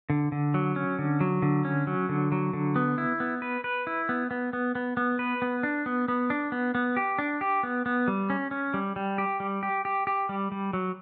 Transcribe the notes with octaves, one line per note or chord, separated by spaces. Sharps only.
D3
D3
F#3
C#4
D3
F#3
D3
C#4
F#3
D3
F#3
D3
B3
E4
B3
B4
B4
E4
B3
B3
B3
B3
B3
B4
B3
D4
B3
B3
D4
B3
B3
G4
D4
G4
B3
B3
G3
C#4
C#4
G3
G3
G4
G3
G4
G4
G4
G3
G3
F#3